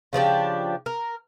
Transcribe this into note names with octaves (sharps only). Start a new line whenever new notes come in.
C#3 F3 D4 G4
A#4